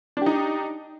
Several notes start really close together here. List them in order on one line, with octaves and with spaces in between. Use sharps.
D4 G4 D#4